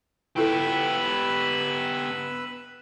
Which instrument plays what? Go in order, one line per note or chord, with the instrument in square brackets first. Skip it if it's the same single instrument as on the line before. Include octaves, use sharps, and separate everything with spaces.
[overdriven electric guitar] B3 G4 [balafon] E4 F4 A4 [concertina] B4 B5 E6